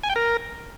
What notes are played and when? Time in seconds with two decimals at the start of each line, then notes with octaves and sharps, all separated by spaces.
0.03 G#5
0.10 G5
0.16 A#4